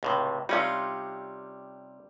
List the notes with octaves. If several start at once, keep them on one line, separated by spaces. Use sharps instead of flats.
C#2 A2 C3
C3 G3 C#4 D#4 F4